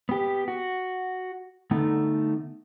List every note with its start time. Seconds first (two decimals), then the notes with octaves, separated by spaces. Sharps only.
0.09 B3 G4
0.48 F#4
1.71 D3 A3 B3 D#4